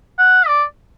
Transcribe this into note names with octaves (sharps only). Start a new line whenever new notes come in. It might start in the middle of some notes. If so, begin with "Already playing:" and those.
F#5
D5